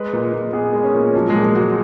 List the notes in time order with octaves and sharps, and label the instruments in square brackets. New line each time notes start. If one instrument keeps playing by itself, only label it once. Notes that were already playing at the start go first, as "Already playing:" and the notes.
Already playing: [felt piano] G#3 [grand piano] B4
[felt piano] A#2
A#2
[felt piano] B3 [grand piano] G#4
[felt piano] G#3
[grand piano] C#4
[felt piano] A#2
[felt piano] F3 [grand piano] F#3
[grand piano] G#3
[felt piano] A#2
[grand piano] G#3
[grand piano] F#3 [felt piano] F#4